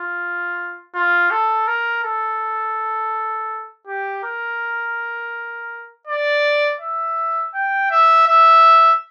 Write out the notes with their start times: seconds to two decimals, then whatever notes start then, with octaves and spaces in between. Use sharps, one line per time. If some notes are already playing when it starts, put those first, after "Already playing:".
Already playing: F4
0.95 F4
1.31 A4
1.67 A#4
2.04 A4
3.87 G4
4.24 A#4
6.07 D5
6.81 E5
7.54 G5
7.91 E5
8.27 E5